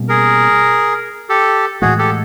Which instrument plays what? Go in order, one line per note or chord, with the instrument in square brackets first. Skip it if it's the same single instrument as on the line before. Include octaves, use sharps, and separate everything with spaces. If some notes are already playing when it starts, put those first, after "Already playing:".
Already playing: [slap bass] B2 G3 A#3 C#4
[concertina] G#4 A#4
G4 A4
[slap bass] A2 E3 G#3 [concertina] F#4 G#4
[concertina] G4 A4